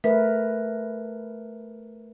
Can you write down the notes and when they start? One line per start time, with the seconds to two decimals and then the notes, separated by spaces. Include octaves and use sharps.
0.04 A3 A#4 B4 E5